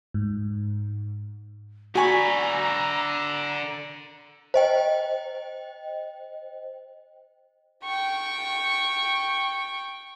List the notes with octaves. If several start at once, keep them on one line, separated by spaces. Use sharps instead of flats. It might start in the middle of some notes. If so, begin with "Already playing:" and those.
G#2
D3 F#4 D5 G#5 A#5 B5 C#6
C5 D#5 G5
G5 C#6